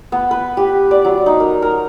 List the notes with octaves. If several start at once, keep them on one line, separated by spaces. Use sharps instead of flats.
B3
B4
G4
D5
F#3
D#4
A#4
A#4